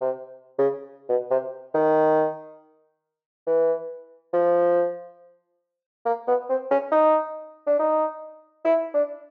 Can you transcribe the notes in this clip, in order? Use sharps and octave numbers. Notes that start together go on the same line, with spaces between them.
C3
C#3
B2
C3
D#3
E3
F3
A#3
B3
C4
C#4
D#4
D4
D#4
E4
D4